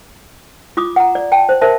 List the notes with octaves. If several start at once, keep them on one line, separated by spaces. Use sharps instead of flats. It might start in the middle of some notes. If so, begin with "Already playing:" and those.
F4 D6 D#6
F#5 A#5
D5
G5 A5
C5
A#4 C5 E5 A5